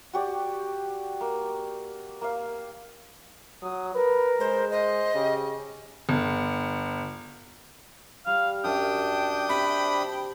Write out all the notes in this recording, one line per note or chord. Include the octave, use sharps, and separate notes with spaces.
F#4 G4 D5
A#3
A#3 F5
F#3 D#6
A#4 B4
G#3 C5
C5 D#5
C#3 G4
G1
G3 F5
F#2 D4 G5 D#6
C3 B5